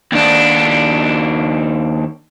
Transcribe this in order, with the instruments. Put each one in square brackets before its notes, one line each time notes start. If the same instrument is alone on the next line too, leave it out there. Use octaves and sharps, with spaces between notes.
[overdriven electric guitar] D#2 D4